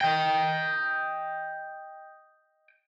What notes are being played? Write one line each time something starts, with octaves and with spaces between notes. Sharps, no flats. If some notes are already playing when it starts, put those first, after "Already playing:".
D#5 G5